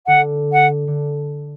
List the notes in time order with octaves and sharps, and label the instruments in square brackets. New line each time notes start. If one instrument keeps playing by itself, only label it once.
[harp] D3 [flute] F#5
[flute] F#5
[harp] D3